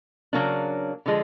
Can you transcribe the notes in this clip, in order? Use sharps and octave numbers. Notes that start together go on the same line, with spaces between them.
C#3 F#3 A#3 D4
D3 F3 G#3